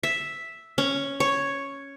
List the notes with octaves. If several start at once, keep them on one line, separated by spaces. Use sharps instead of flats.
E5
C#4
C#5